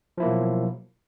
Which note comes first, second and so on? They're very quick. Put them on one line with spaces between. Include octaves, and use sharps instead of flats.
F3 E4 A#3 B2 F#3